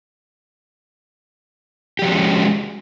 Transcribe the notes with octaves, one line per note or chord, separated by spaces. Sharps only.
F3 G#3 C#4 F#4 G4